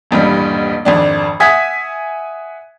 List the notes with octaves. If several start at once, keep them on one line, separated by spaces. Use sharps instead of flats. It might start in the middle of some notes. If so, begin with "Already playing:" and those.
D#1 A1 G2 G3
G#1 F2 D4
E5 F#5 G#5 D#6 G#6 B6